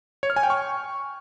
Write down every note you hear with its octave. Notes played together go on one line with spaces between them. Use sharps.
C#5
F6
G#5
G5
C#6